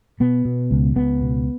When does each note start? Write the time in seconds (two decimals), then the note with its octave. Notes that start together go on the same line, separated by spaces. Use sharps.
0.20 B2 B3
0.45 B2
0.71 C#2
0.96 C#2 B3
1.21 B2